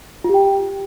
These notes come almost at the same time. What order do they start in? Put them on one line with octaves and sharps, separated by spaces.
F4 G4 G5